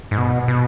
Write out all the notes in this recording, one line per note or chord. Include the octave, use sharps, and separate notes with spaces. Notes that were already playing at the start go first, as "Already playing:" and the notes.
G#2
B2
B2